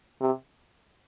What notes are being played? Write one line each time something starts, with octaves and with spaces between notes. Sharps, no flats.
C3